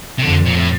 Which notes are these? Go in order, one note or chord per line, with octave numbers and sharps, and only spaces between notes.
C3
F2 D3
A#2
A2